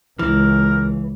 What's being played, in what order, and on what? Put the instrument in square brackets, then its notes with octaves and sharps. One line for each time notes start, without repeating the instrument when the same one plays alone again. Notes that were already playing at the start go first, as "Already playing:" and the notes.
[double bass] C#2 [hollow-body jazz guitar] E3 [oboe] A#4